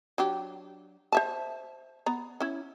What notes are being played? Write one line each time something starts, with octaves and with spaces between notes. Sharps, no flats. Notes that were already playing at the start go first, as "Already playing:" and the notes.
F#3 D4 G4
C5 E5 A5
B3 A#5
C#4 E4